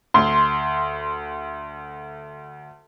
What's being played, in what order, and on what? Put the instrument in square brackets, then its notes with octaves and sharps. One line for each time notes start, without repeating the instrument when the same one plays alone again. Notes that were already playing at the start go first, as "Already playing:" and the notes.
[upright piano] D2 [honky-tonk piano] C6